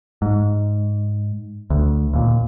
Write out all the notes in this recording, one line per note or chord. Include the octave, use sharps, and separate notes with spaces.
G#2
D2
D#2 A#2